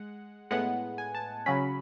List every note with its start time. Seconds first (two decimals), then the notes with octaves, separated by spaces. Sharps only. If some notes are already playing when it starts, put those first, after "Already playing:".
Already playing: G#3 F#5
0.51 A2 G#3 B3 F#5
0.98 G#5
1.15 A5
1.46 C#3 F#3 C#4 B5